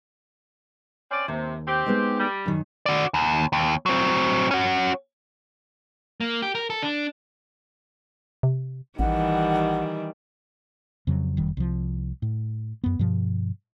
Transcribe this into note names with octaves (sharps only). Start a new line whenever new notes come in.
C4 C#4 D5
D#2 C3
C4 G4
G#3 B3 D#4
G3
F#2 D#3
F#4 D5
D#2
D#2
F#3 C4
C#4 F#4
A#3
G4
A#4
A4
D4
C3
A1 D#3 E3 G3 F#5
F2 C#3 F#3
F1 D#3 G3
C2 F3
A2
F#2 B3
G2 B2 F3